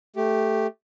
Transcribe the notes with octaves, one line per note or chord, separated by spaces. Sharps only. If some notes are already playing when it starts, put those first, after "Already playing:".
A3 G4